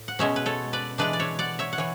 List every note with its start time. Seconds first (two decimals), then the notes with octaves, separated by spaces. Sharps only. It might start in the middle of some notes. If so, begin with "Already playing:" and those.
Already playing: A2
0.08 F#5
0.19 B2 G#3 C#4 C#5 E5
0.36 B4
0.46 A4 C#5
0.73 B4 D5
0.98 E3 G#3 D4 B4 D5
1.13 D5
1.20 C#5 E5
1.39 D5 F#5
1.59 C#5 E5
1.73 F#5
1.78 E3 C#5